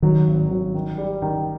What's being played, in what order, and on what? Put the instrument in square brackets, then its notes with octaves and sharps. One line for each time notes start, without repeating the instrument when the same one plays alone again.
[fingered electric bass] D#3 [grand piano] F#3
[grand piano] G#1
F#3
D#3
G3
D#3